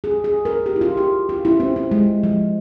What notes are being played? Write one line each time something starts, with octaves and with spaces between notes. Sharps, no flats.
G#4
G#4
A#4
G4
E4
F4
G4
F4
E4
C4
C4
G#3
F3